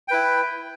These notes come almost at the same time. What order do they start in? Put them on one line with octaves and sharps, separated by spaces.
G5 B4 E4